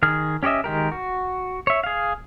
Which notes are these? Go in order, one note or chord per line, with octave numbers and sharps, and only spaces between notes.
D#3 G#4 F6
C#4 G4 C#5 D#5 E5
D#3 G#3 G4 A#4
F#4
C#5 E5
G#4 F5